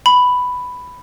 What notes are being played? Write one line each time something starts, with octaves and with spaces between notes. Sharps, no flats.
B5